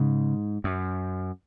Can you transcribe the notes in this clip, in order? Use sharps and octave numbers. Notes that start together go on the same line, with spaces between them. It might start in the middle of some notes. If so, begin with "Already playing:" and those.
Already playing: G#2 C#3
F#2